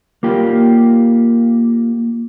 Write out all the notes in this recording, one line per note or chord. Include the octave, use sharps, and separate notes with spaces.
A#3 F4 G4